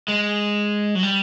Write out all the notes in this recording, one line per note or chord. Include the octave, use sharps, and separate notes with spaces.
G#3
F#3
G3